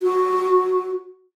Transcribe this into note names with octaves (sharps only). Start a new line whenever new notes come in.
F#4